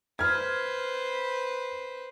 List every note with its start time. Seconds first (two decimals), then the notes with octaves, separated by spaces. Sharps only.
0.19 B4 C5 F6 G#6